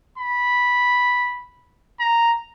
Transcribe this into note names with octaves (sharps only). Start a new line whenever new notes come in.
B5
A#5